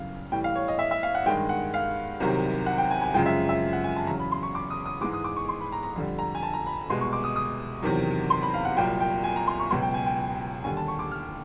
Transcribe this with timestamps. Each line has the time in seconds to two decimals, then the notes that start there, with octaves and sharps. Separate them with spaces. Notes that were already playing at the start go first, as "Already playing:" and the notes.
Already playing: F#2 C#3 E3 G3 F5
0.32 A2 E3 G3 G5
0.44 F5
0.55 C#5
0.68 D#5
0.79 E5
0.91 E5
1.03 F5
1.15 F#5
1.26 G2 D#3 G#3 G5
1.49 F#5
1.74 F5
2.20 C2 C3 D#3 F#3
2.66 F#5
2.78 G5
2.91 G#5
3.02 G#5
3.14 F#2 C#3 F3 G#3 G5
3.26 E5
3.49 E5
3.73 F#5
3.84 G#5
3.96 A5
4.07 E2 C#3 F#3 A#5
4.19 B5
4.32 C6
4.43 C#6
4.55 D6
4.70 D#6
4.86 D#6
5.01 G#2 E3 G#3 D6
5.13 D#6
5.24 D6
5.36 C#6
5.49 C6
5.61 B5
5.72 A#5
5.83 A#5
5.96 F2 D3 G3
6.19 A#5
6.35 G#5
6.43 A5
6.53 A#5
6.66 B5
6.90 C2 B2 G#3 C6
7.01 C#6
7.13 D6
7.24 D#6
7.36 D#6
7.82 E2 C3 D#3 F#3
8.30 C6
8.42 B5
8.54 F5
8.65 F#5
8.77 C2 A#2 F#3 G5
9.00 G5
9.24 G#5
9.36 A#5
9.47 C6
9.60 C#6
9.71 C#2 B2 F#3 C6
9.82 G5
9.94 G#5
10.06 G5
10.64 D#2 D3 G3 G#5
10.77 A5
10.88 C#6
10.99 D6
11.12 F6